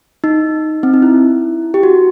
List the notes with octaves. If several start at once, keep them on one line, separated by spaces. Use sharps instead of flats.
D#4
C4
D#4
E4
G4
F#4